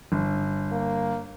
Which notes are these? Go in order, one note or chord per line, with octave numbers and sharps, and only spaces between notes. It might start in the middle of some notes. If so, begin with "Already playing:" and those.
G1
A#3